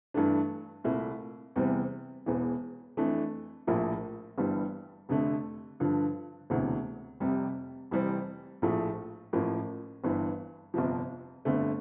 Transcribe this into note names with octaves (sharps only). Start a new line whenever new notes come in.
G2 E3 A3 D4
C2 A#2 A3 E4
E2 C3 E3 G3 C4
E1 E2 E3
F2 E3 A3 D4
A#1 A2 F3 A#3 E4
G1 G2 E3 G3
F1 F2 D3 A3
G2 D3 F3
E1 D2 C3 E3
F1 F2 C3 G3
F1 F2 E3 G3 C4
A#1 A2 F3 A3
A1 A2 F3 A#3
G1 G2 E3
G1 F2 C3 F3
G1 F2 D3 A3